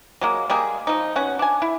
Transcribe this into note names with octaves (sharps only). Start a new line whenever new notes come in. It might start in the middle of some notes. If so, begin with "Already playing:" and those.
F#3 G#3 A#3
G3 G#3 A#3 G#4
F3 D#4
B2 C#4 F#5
D4 G#5
E4